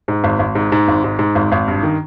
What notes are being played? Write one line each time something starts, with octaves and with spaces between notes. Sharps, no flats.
G#2
G#1
G#1
G#2
G#2
G#1
G#2
G#2
G#1
G#1
G2
D#3